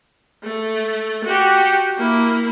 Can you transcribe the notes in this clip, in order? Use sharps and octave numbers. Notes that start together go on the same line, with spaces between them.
A3
F#4 G4
A#3 E4